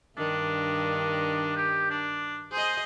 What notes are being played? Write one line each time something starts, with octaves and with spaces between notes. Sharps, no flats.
G2 D#3 D4
G4
D4
G#4 C5 D#5